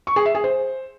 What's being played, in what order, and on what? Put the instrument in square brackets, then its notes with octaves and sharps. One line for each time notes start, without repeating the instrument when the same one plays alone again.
[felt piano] C#6
G#4
E5
G#4
C5